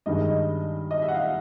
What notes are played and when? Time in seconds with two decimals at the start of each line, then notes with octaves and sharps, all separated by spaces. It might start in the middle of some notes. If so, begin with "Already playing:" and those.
0.06 G2 D#3 G#3 D#5
0.91 D#5
1.02 E5
1.08 F#5
1.14 F5